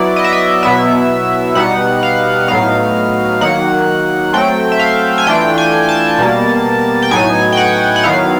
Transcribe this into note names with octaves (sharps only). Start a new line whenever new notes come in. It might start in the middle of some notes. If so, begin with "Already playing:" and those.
Already playing: F#3 B3 E4 D5
D#5
E5
D#5
B2 F#3 B3 E4 E5
B2 G3 B3 D#4 F#5
F5
A2 F#3 B3 D#4 F5
D#3 F#3 A#3 F#5
F#3 A3 C4 G5
E5
F5
G#5
E3 A3 D4 F4 G5
G#5
A5
B2 G3 A#3
G5
A2 F#3 B3 D#4 G#5
G5
F#5
F#5
D#3 F#3 B3 E4 F5